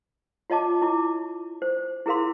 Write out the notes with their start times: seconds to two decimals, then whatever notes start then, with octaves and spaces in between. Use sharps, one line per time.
0.50 F4 C#5 D#5 A5 D6
0.82 E4 D6
1.62 C5
2.06 E4 G#4 A#4 F5 C6